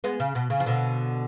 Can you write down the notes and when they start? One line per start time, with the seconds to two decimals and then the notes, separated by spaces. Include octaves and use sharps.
0.04 G#3 B3
0.20 C#3
0.35 B2
0.50 C#3
0.60 F3
0.66 B2 D3